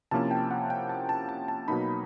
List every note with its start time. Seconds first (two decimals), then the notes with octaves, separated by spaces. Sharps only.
0.11 C3 F3 A#3 C#4 E4 A5
0.31 G5
0.51 F#5
0.70 G5
0.89 A5
1.09 A5
1.29 A5
1.48 A5
1.68 B2 F#3 A#3 D#4 B5